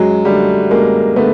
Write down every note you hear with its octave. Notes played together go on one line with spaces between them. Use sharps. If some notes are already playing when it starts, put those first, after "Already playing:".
Already playing: F#2 F#3 G#3
D3 G3 A3
F#2 G#3 A#3
D3 A3 B3